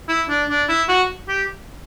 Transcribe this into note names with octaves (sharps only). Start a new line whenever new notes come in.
E4
D4
D4
E4
F#4
G4